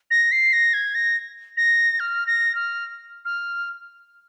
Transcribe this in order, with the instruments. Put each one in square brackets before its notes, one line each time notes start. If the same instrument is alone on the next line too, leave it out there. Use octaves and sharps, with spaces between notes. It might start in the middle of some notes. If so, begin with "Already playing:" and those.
[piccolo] A#6
C7
A#6
G#6
A#6
A#6
F6
A#6
F6
F6